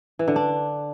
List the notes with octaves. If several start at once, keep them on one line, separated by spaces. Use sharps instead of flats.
E3
D3
D4